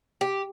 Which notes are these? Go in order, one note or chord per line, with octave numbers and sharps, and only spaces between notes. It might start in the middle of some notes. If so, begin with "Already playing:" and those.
G4